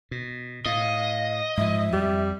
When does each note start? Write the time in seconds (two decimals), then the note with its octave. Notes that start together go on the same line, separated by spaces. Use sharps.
0.11 B2
0.66 A2 D#5 F5
1.57 G#2 F3 E5
1.93 F2 G3